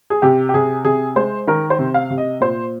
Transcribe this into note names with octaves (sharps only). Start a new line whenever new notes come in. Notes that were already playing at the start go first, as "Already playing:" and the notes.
G#4
C3 G4
G4
C3 G#4
C3 G#4
G#3 C5
D#3 A#4
C5
C3
F5
C3
D#5
A#2 C5